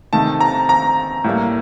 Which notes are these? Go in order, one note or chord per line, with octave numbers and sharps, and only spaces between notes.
C3 D#3 A3 A5
A#5
A#5
A2 G3 A#3